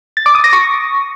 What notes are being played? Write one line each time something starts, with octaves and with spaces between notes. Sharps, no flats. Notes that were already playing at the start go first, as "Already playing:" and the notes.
A6
D6
D#6
A#6
C#6